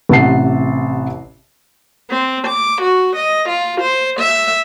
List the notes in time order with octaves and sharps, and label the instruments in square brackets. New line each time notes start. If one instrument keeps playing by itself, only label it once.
[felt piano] A1 C3 F#5 A5 C7
[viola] C4
D6
F#4
D#5
F4
C5
E5